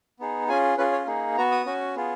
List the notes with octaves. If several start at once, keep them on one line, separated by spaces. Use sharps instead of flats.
B3 D#4 G#4
C#4 F4 G#4 G#5
C#4 F4 G#4 B4
C#5
A#3 D#4 G#4
B3 F#4 A#5
D#6
C#4 F#4
B3 F4 G#4